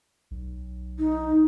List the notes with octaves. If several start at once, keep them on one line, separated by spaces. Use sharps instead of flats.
B1
D#4